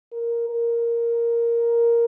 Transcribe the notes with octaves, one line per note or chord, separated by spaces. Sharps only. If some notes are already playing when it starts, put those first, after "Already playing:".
A#4
A#4